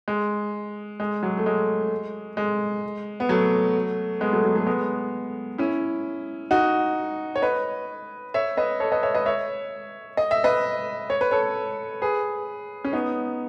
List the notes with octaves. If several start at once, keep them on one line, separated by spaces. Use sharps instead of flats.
G#3
G#3
F#3
A3
G#3
G#3
B3
F#3 A3
G#3 B3
F#3 A3
F#3
F#3 A3
G#3 B3
C#4 E4
D#4 F#4
C#5
B4 D#5
C#5 E5
B4 D#5
A4 C#5
B4 D#5
C#5 E5
B4 D#5
C#5 E5
D#5
E5
B4 D#5
C#5
B4
A4 C#5
G#4 B4
C#4
B3 D#4